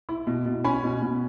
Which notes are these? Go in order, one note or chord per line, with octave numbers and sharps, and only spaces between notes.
E4
B2
B2
C#4 G#5 B5
B2
B2